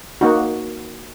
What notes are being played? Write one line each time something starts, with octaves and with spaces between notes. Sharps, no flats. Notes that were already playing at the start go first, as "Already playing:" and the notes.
A#3 D#4 F#4